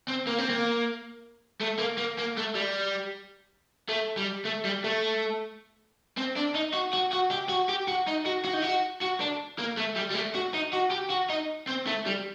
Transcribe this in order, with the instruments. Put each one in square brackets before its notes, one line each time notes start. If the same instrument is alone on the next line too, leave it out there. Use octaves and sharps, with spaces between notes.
[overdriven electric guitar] C4
A#3
C4
A#3
A3
A#3
A#3
A#3
A3
G3
A3
G3
A3
G3
A3
C4
D4
D#4
F#4
F#4
F#4
G4
F#4
G4
F#4
D#4
F#4
F#4
D#4
F#4
F#4
D4
A#3
A3
G3
G3
A3
F#4
D#4
F#4
G4
F#4
D#4
C4
A3
G3